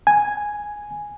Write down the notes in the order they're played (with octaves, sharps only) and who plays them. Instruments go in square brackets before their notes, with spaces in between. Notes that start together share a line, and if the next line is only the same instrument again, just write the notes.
[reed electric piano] G#5